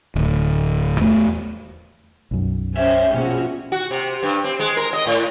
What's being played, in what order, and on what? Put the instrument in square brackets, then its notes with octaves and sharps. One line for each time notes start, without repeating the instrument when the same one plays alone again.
[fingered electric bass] D1
E2 A3
[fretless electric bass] B1 F#2
[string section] C#4 G4 C5 [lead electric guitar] E5
[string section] A#1 F#4 [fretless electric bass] B2 [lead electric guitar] C#4
[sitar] F#4
C3
G2
C4
G#3
A#4
D#5
A2